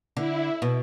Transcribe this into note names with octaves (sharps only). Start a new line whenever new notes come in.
D3 E4
B2